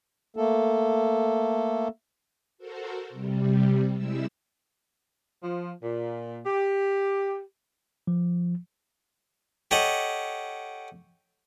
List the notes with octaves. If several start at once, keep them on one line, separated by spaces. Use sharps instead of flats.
A3 A#3 A4
F#4 A4 A#4 C5
C3 G3
C3 G3 G#3 E4 E6
F3
A#2
G4
F3
G4 A4 C#5 D#5 F#5